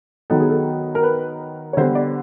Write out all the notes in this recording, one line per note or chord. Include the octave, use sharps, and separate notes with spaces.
D#3 F#3 B3 D#4 A4
G#4
A4
A#4
B4
C#5
D3 G3 B3 C5
D5